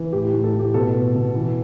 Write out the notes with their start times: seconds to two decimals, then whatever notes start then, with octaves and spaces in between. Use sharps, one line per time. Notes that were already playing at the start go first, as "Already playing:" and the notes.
Already playing: E3
0.13 A2 G4
0.33 A2
0.44 A4
0.54 A2
0.59 G4
0.74 B2 A4
0.94 B2
1.15 B2
1.35 E3